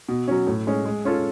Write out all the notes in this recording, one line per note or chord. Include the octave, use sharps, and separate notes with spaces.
B2
F#3 C#4
A2
G#3 C#4
G#3
C#4 F4 A4